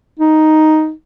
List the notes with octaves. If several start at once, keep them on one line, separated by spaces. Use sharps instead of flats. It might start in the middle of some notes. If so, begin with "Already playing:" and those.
D#4